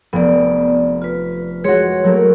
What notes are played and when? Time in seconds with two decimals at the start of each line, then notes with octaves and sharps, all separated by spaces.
0.13 F1 B3 D5
1.02 F4 B4
1.64 G#3 F#4 G#4 C#5 C6
2.04 F#3 A3 A#3